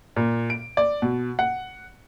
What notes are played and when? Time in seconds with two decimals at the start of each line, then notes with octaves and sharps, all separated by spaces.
0.16 A#2
0.50 D7
0.77 D5
1.02 B2
1.39 F#5